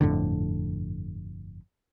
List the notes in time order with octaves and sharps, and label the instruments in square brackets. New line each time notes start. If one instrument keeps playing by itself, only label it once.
[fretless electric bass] G1 F2 A2 D3